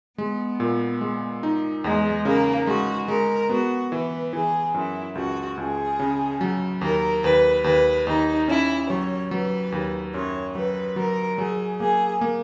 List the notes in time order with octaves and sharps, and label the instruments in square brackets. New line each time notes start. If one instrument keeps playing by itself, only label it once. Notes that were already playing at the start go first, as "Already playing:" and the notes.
[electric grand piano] G#3 [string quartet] B3
[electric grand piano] A#2
G#3
D#4
[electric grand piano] E2 [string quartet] G#3
[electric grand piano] C#3 [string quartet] A#3
[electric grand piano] G#3 [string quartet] F#4
[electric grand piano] G#3 [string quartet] A#4
[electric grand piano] B3 [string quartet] F#4
[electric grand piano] E3 [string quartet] B4
[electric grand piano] E3 [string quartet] G#4
[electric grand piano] F#2 [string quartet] E4
[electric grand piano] C#2 [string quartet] F#4
[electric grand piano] C#2 [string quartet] G#4
[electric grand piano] C#3
F#3
[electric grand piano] D#2 [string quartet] A#4
[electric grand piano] D#2 [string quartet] B4
[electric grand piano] D#2 [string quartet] B4
[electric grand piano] D#2 [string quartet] D#4
[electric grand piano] C#4 [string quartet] E4
[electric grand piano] F#3 [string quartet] C#5
[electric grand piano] F#3 [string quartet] B4
[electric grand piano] D#2
[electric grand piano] F#2 [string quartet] C#5
[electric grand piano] F#3 [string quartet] B4
[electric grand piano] F#3 [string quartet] A#4
[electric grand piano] F#3 [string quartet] G#4
[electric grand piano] A#3 [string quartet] G#4
[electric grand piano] A#3